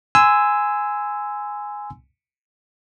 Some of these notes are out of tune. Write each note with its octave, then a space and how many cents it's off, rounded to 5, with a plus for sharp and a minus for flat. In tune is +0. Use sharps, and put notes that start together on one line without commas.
G#5 +0 C6 -25 E6 +0